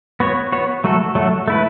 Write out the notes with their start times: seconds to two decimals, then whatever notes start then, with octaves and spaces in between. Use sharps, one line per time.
0.20 B3 F#4 C#5
0.52 B3 F#4 C#5
0.84 F#3 A3 F#4 A4
1.15 F#3 A3 F#4 A4
1.48 A3 E4 B4